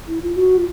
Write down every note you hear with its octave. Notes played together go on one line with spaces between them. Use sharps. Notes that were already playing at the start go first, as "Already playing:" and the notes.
E4
F4
F#4
F4